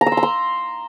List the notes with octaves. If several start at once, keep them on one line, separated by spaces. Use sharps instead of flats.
A#5
E6
C6
A#5
C6